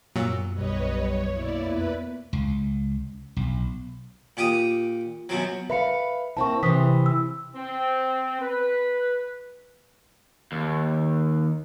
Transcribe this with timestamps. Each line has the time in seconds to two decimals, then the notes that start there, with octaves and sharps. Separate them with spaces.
0.16 F#2 A#2 F#3 E6
0.54 B1 G3 B4 C#5 D#5
0.93 C#5
1.32 B2 A#3 E4 D5
1.64 F2 B3 B4 E5
2.33 C#2
3.37 B1
4.37 A#2 G4 D#6
5.29 F#2 B2 F#3
5.70 B4 E5 F5 B5 C#7
6.37 A#3 C4 E4 A5 C#6
6.63 C3 E3 C5 D#6 B6
7.06 E6
7.55 C4
8.41 B4
10.52 D#2